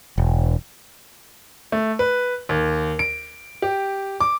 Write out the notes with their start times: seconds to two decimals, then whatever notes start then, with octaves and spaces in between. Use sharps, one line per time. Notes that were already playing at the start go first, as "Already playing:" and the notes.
0.18 E1
1.72 A3
1.99 B4
2.49 D#2
2.99 D7
3.62 G4
4.20 D6